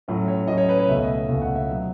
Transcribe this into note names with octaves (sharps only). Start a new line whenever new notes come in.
A2 F#3 C#4
C#5
A2 F#3 C#4 D#5
C#5
B4
C#5
C#2 B2 A3 C#4 E5
D#5
C#2 B2 A3 C#4
F#5
E5
B2 F#3 B3